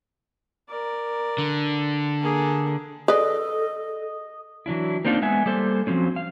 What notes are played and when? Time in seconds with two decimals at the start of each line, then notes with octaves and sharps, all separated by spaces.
0.69 A#4 D5
1.38 D3
2.20 A#3 G#4
3.08 G#4 A4 B4 D5 D#5
4.66 E3 F#3 D4 E4
5.05 A#3 C4 D4 D#4 F4
5.22 G#3 B3 E5 G#5
5.46 G3 A#3 A4 C5
5.87 F3 F#3 C4 C#4
6.16 F5